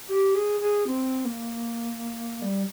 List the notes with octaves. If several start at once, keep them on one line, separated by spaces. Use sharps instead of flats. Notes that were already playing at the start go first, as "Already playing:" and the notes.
G4
G#4
G#4
C4
A#3
G3